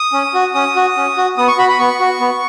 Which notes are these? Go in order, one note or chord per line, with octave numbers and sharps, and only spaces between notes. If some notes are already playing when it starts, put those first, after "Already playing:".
Already playing: D#6
C#4
F#4
C#4 D#6
F#4
C#4
F#4
B3 D#6
C#6
F#4 B5
B5
B3 C#6
F#4
B3